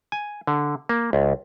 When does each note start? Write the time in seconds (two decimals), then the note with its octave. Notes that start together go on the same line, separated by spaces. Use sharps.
0.12 G#5
0.47 D3
0.89 A#3
1.13 C#2